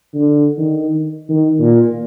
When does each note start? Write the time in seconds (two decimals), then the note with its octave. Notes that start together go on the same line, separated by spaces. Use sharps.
0.14 D3
0.58 D#3
1.29 D#3
1.59 A#2